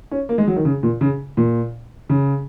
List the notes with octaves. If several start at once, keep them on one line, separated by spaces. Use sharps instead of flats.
C#4
A#3
G#3
F#3
D#3
C#3
A#2
C#3
A#2
C#3